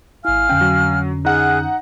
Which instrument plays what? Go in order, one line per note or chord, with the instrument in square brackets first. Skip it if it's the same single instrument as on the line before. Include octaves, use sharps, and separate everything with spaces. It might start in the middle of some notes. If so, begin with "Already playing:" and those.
[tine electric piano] G#1 E4 [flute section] F5 G#5 F6
[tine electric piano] F2 D3 C#4 [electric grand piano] G5
[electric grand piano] F#3
[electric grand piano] D#4 F#5 [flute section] G#4 F6 F#6